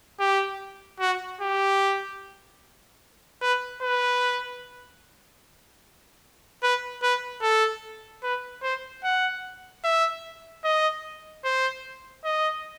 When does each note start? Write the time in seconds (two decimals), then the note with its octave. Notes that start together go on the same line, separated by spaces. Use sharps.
0.20 G4
1.00 F#4
1.41 G4
3.42 B4
3.82 B4
6.63 B4
7.03 B4
7.42 A4
8.23 B4
8.63 C5
9.04 F#5
9.84 E5
10.64 D#5
11.45 C5
12.25 D#5